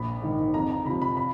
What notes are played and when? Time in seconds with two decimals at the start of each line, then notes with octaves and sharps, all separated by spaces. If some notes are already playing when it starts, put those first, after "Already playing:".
Already playing: A#1 B5
0.22 G#2 D#3
0.54 F2 A#5
0.70 A#5
0.86 C3 F3 B5
1.02 B5
1.17 B5